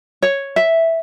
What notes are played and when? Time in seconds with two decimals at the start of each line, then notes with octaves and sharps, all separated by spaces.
0.22 C#5
0.56 E5